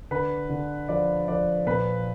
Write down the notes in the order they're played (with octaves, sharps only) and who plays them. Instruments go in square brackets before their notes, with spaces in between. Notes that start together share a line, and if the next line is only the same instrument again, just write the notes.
[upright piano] D3 B4
D3
F3 D5
F3 D5
A#2 B4